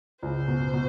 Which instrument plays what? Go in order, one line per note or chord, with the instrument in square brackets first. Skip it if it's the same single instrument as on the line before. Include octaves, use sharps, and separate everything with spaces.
[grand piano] C#2 [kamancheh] C5
[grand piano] B2
B2